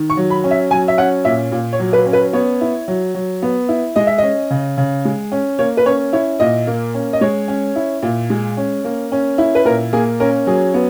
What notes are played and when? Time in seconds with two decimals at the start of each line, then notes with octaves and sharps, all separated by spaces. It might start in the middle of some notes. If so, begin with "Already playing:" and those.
Already playing: D#3
0.10 C#6
0.17 F#3
0.30 B5
0.44 C#4
0.51 E5
0.71 F#3 G#5
0.88 E5
0.98 C#4 F#5
1.25 A#2 E5
1.52 A#2
1.73 C#5
1.80 F#3
1.93 B4
2.06 C#4
2.13 B4
2.33 B3 C#5
2.61 E4
2.88 F#3
3.15 F#3
3.42 B3
3.69 E4
3.96 G#3 D#5
4.07 E5
4.18 C#4 D#5
4.50 C#3
4.78 C#3
5.05 G#3
5.32 C#4
5.59 A#3 C#5
5.77 B4
5.86 C#4 C#5
6.13 E4 C#5
6.40 A#2 D#5
6.67 A#3
6.94 C#4
7.13 D#5
7.21 G#3 C#5
7.48 C#4
7.76 E4
8.03 A#2
8.30 G#3
8.57 C#4
8.84 A#3
9.12 C#4
9.38 E4
9.55 B4
9.65 A#2 A#4
9.93 A#3 G#4
10.20 C#4 A#4
10.47 F#3 G#4
10.74 B3